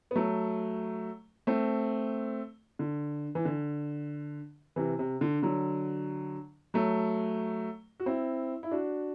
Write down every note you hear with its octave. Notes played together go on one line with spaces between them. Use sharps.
B3
F#3 A3
A3 C4
D3
E3
D3
C3 E3
C3
D3
D3 F#3
F#3 A3
F#4
C4 E4
E4
D4 F#4